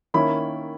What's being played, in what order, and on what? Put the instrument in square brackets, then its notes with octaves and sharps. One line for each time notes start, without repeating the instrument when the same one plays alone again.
[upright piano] D#3 A#3 C#4 E4 B5